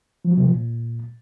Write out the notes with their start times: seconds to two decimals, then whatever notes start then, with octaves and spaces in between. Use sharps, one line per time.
0.25 F3
0.31 F#3
0.37 C3
0.44 F3
0.50 A#2